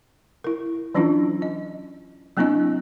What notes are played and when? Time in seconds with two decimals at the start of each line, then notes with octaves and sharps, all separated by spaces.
0.44 E4 A#4
0.95 E3 F#3 C#4 D4 E4 F4
1.42 D#5
2.37 F#3 A#3 C4 D4 E4 D#5